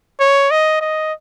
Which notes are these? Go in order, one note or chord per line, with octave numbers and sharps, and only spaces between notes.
C#5
D#5
D#5